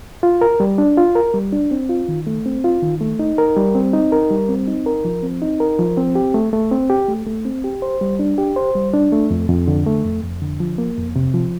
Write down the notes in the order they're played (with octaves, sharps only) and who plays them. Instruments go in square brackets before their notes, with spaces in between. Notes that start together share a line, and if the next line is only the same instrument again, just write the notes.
[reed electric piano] F4
A#4
G3
D4
F4
A#4
G3
D4
C4
F4
D#3
A3
C4
F4
D#3
A3
D#4
A#4
G3
C4
D#4
A#4
G3
C4
D#4
A#4
F3
C4
D#4
A#4
F3
C4
G4
A3
A3
C4
G4
A3
A3
C4
G4
C5
G3
D4
G4
C5
G3
D4
A3
F2
F2
D3
A3
F2
F2
D3
F3
A#3
F2
C3
F3